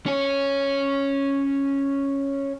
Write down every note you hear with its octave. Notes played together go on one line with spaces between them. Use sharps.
C#4 C#5